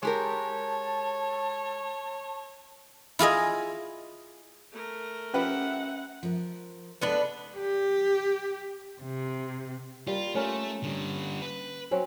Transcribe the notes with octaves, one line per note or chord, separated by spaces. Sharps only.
G#3 G4 A#4 C#5 A5
E4 F4 G#4 D#5
A3 A#4
F3 C#4 G4 B4 E5 F#5
F3 A#4
G#3 B3 D4 A4 B4
G4
C3
G3 A#3 F4
A3 C#4 F4 A#4
D3 G3
B4
F#3 C4 C#4